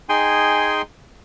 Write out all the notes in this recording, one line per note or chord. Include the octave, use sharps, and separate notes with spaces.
D#4 G#4 G5 G#5 C6